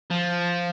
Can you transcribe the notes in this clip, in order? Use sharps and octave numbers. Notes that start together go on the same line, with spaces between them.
F3